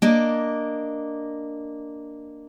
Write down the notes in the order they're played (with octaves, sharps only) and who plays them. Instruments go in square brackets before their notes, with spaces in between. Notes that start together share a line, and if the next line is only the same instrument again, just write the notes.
[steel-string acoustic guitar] A#3 D4 D#5